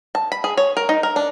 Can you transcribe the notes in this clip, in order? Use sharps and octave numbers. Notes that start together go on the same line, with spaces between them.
A5
B5
G#4
C#5
A#4
D#4
A#4
D4